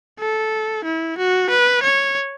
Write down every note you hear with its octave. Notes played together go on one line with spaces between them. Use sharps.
A4
E4
F#4
B4
C#5